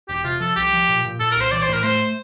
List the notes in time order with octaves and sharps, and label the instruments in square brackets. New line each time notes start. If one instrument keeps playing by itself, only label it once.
[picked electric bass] E1 [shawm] G4
[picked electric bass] C3 [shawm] F4
[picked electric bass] F3 [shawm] A4
[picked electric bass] C2 [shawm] G4
[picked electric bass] F3
A#2
A#2
[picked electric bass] A#2 [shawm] A4
[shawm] A#4
[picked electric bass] C2 [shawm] C5
[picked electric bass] E3 [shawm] D5
[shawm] C5
[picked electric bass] A2 [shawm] A#4
[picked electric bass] A3 [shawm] C5